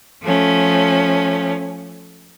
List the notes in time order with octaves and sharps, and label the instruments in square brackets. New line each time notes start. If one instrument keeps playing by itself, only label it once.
[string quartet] F3 A3 C#4